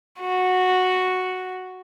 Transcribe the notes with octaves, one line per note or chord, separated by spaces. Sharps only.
F#4